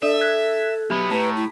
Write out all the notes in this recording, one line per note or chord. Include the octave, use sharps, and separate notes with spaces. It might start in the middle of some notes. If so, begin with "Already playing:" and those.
D4 A4 D5 E5
F#6 G#6 B6
B1 B3 G4 E5 B5
A2 B4 A5 A#5 B6
E4